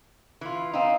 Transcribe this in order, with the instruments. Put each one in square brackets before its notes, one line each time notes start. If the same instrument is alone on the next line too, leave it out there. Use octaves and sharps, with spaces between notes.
[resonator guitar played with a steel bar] E3 F4
[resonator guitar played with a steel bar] C4 D#4 [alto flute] F5